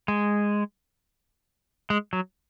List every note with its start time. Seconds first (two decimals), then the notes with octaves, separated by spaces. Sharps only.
0.08 G#3
1.90 G#3
2.13 F#3